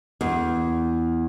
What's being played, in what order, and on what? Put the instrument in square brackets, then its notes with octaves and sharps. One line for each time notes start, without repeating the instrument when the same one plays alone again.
[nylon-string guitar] E2